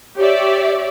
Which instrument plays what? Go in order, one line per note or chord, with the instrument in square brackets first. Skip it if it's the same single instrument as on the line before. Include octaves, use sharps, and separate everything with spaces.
[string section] G4 C#5 D5 E5